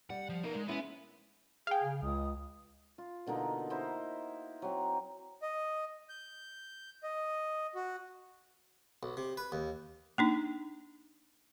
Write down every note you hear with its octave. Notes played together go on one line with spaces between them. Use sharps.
G3 F#5
F3
B3 D#4 A#4 F5
G#3
G#3 B3 C#4 E4
G#4 F5 G5
C#3
C#2 D#6
F4
B2 D3 A#3 D#4
D#4 E4 C5
F#3 C4
D#5
G6
D#5
F#4
B1
C3
B4
D#2
A#3 D4 D#4